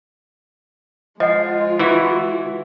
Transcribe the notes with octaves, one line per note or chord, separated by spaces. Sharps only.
F3 G#3 F4 D#5 F#5
E3 E4 F#4